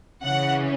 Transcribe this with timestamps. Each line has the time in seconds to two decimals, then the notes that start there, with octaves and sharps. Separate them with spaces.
0.23 C#3 E3 C#4 F#5